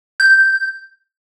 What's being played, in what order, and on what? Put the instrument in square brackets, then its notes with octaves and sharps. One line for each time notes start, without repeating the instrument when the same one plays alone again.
[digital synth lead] G6